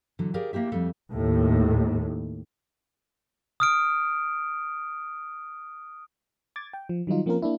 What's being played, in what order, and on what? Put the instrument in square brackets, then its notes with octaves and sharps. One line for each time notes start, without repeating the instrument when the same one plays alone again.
[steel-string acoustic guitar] D3 E3 F#3
G4 G#4 A#4 D5 F5
A#3 E4 G4 E5
F2 G3 A4 E5 F5
[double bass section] D#2 A2
[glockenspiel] D#6 F6 D7
[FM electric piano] D6 G#6 A6
G5
F3
D#3 F#3 G3 D#4 F4
F3 A#3 C4 C#4 F4 A#4
A#3 D4 E4